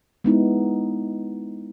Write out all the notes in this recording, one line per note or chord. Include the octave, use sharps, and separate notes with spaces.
G#3 B3 D#4 E4